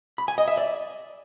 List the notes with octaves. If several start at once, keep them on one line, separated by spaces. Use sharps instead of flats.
B5
G#5
D#5
E5
D5